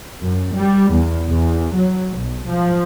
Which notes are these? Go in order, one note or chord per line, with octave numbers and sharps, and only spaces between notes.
F#2
G3
E2
E2
F#3
B1
F3